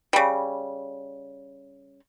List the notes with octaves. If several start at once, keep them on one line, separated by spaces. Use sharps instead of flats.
C#3 G3